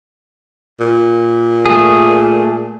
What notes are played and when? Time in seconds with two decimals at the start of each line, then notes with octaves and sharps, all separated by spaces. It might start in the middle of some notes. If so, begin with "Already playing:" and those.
0.80 A#2
1.66 A3 G#4